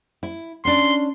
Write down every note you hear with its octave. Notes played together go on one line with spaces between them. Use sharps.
E4
C#4 D4 C6